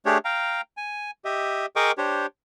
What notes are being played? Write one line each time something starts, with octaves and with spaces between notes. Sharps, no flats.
A3 D4 G4 G#4 C#5
F5 G5 A#5
G#5
G4 D#5 E5
G#4 A#4 D#5 G5 C#6 D6
D4 G4 C5 C#5